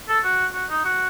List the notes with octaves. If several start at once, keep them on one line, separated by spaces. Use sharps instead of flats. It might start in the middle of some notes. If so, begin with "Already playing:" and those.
A4
F#4
F#4
D#4
F#4